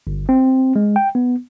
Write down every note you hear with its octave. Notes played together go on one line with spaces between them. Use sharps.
G1
C4
G#3
G5
B3